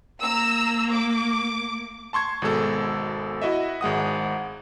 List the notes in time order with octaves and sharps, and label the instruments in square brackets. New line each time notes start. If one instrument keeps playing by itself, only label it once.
[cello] A#3 [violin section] A#5 E6
[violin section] D6
[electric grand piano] A5 C6 C#6 G#6
G#1 B2 G#3 A4
E4 F#4 D#5 E5
G#1 G#3 F#5 D#6